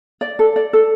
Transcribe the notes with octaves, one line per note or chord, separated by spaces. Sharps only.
D5
A4
D5
A4